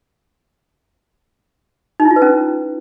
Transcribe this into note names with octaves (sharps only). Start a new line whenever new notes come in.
D#4
E4
F4
B4
C#4